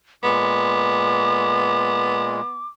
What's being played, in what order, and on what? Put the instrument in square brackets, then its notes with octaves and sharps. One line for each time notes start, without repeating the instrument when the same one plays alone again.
[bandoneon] A#2 G#3 [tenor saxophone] B3 [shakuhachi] D6